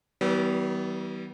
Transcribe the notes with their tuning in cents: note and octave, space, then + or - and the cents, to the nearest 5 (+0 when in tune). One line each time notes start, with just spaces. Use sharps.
E3 -45 G3 -40 B3 +0